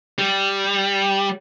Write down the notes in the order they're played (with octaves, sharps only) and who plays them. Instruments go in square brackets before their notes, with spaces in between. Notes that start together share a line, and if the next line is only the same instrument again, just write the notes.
[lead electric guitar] G3